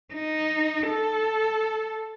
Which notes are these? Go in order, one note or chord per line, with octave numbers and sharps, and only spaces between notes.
D#4
A4